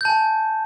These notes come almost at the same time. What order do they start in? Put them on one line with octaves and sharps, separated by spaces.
G6 A5 G#5